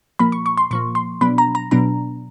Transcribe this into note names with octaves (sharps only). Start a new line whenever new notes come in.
A#2 F3 A#3 B5
C#6
C#6
C6
A#2 F3 A#3 C#6
C6
B2 F#3 B3 D4 B5
A#5
A#5
B2 F#3 B3 D4 A#5